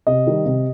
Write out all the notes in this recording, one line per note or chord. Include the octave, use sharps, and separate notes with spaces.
C3 D#5
D#3 G3
C3